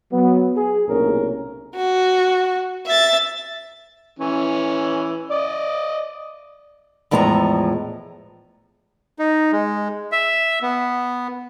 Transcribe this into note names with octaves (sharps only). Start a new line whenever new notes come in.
F#3 B3
G#4
B1 A2 C3 A#3 C#4 A#4
F#4
E5 A6
E3 C#4
D5 D#5
E2 A2 F3 G#3 A5 A#5
D#4
G#3
E5
B3